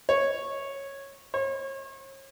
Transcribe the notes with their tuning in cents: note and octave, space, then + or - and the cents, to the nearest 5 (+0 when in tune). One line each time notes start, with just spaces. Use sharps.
C#5 -10
C#5 -40